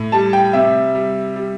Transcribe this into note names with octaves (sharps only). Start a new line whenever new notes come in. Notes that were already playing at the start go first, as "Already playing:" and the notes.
Already playing: A2
G3 A5
G5
C3 E5
G3
G3